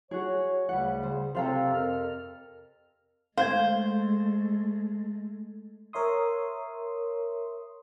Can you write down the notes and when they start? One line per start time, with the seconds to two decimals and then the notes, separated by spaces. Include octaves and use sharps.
0.11 F#4 G#4 C#5
0.69 D2 C#3 G3 B4 F#5
1.03 C#3 C5
1.35 C3 C4 A4 C5 F5 A#5
1.74 F2 A#4 F6
3.38 G#3 A3 C5 F5 G6 G#6
5.93 A#4 C#5 E5 C6 D#6